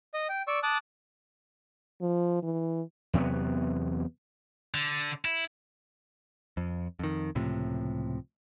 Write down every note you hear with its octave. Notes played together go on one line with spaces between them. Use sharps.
D#5
G5
D5 C#6 E6
A5 D6 D#6 F#6
F3
E3
E2 C3 F#3 B3
D3
E4
F2
F2 D#3
C#2 A2 C3 F3